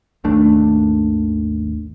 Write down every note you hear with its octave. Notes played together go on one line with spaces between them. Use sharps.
G#1 D#2 A3 D4